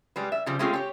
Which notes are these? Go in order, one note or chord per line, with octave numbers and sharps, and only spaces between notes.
G3 G#3 B4
E5
C#3 F3 G3 C4
G#3 A3 C4 C#4 F4 G#4
G4 C#5